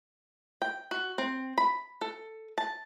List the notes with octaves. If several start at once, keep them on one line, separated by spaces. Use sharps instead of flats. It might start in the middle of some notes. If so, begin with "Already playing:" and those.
G5
F#4
C4
B5
A4
A5